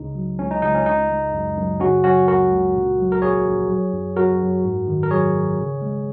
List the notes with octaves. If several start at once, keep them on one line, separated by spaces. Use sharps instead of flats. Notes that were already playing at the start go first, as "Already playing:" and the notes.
Already playing: C#2 C#3 D#4
F#3
C#2 C#4
D#4
C#2 D#4
C#4
C#3 D#4
G#3
F#2
F#2
C#3 C#4 F#4
F#3 C#4 F#4
C#2 F#4 A#4
C#2
A#2
F#3
A#4
A#1 G#4 C#5
A#1
F#3
F#2
F#3 F#4 A#4
F#2
G#2
D#3
A#4
F#3 G#4 C#5
G#1
C#3
G#3